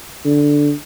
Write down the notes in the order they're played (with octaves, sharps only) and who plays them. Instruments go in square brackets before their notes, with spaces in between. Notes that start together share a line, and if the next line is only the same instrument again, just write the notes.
[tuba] D3